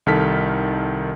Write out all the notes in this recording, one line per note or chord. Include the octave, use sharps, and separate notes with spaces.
C2 D#3 A4 F6 B6